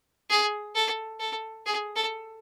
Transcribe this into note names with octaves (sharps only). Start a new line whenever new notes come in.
G#4
A4
A4
G#4
A4